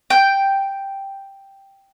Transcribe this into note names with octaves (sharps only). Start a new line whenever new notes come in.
G5